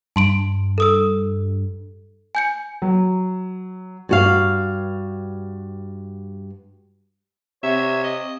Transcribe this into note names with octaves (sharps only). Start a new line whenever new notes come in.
G2 A5 C6 D7
A4 D#6 E6
G#5 G6 C#7
F#3
G2 F#4 F5
C3 C#5 E5
D#5